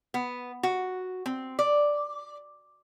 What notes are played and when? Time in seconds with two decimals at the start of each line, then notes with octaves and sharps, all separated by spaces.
0.14 B3
0.63 F#4
1.26 C4
1.59 D5